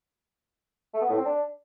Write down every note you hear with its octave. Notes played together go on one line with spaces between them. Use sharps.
A3
B3
A2
C4
D4